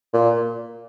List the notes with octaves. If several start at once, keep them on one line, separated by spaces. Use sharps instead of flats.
A#2